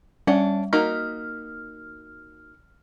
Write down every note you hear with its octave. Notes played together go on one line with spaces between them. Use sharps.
G3 C#4 D4 F#5
A#3 D#4 F#4 F6